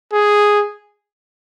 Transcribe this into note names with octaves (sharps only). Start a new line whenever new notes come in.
G#4